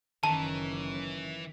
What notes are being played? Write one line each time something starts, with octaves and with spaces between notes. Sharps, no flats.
F#1 D#3 E3 C#4 A5